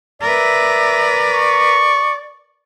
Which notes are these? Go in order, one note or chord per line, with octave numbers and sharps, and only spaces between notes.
A#4 B4 D5 E5
C#6